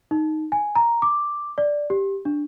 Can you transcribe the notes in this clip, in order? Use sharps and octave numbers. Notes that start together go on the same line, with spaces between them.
D#4
G#5
A#5
D6
D5
G4
D4